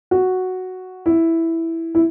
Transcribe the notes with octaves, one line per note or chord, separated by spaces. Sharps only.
F#4
E4
E4